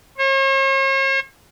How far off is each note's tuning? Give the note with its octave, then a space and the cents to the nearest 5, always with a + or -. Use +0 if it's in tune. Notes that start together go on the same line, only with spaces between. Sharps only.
C#5 -45